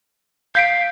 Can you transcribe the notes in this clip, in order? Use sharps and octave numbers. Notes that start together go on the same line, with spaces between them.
F5 G6 B6 D7